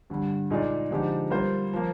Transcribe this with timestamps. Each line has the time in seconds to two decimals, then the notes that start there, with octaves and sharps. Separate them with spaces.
0.10 G2 D3 G3
0.50 A#2 G#3 D#4 G#4 D5
0.91 D3 F3 G#3 D#4 G4
1.30 G3 A#3 F4 C5
1.74 F3 A#3